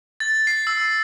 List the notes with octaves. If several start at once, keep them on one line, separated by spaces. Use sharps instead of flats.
A6
C7
E6